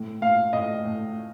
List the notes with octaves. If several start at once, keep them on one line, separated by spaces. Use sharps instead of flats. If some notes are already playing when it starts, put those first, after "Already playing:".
Already playing: A2
A2 F5
A2 D#5
A2